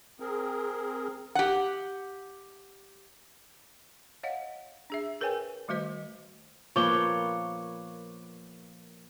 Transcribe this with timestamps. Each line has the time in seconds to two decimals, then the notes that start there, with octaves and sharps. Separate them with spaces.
0.20 C4 G#4 A#4
1.35 G4 F#5
4.23 C#5 D#5 F5 F#5
4.90 D4 G#4 E5
5.21 G#4 A#4 B4 C#5 G5 G#5
5.68 D#3 G3 A3 F#4 C5 D#5
6.76 F3 A#3 B4 C#5 C#6 D6 G7